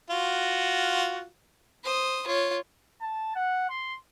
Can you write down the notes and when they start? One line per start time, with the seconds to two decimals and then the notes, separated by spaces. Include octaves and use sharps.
0.10 F4 F#4
1.84 C5 D#6
2.27 F4 C#5
3.02 A5
3.36 F#5
3.70 C6